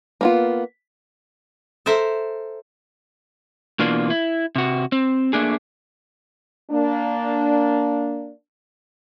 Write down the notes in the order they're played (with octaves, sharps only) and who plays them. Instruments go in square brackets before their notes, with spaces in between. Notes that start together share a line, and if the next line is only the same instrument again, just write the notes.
[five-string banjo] A#3 B3 F4
[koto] A4 A#4 C5 E5
[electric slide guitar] B2 E3 A#3 D4 F4
E4
C3 F#4
C4
A3 A#3 D4 G#4
[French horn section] A#3 D4